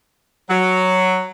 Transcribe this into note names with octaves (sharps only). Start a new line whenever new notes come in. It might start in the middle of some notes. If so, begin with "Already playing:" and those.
F#3